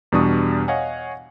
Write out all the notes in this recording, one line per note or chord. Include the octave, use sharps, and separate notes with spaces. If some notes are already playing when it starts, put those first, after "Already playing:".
E2 B2 G3 D4 C#6 D#6
C#5 D#5 F5 F#5 G#5